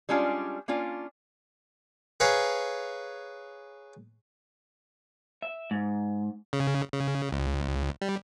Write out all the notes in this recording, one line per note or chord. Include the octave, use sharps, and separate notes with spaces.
G3 G#3 C#4 D4 F4
A#3 C#4 D4 F4
G#4 B4 C#5 F5 A#5
E5
G#2
C#3
C#3
C#2
G3